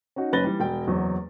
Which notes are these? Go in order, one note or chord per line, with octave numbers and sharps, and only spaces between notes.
C#4 D#4 F#4
F#1 C#4 B4 A6 A#6 G7
E3 G3
E1 G5
F#1 E2 F#3